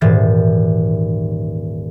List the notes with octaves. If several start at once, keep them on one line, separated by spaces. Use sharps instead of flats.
D#1 G#2 E3 A6